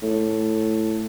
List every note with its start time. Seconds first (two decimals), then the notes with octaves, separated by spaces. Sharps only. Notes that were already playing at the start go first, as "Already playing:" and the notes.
0.02 A2